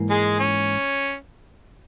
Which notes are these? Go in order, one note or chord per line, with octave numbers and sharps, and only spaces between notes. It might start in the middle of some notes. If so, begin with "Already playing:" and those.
Already playing: G#2 E3 A#3
G#3 G#4
C#4